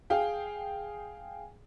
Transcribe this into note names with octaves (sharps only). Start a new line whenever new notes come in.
G#4 F5 G5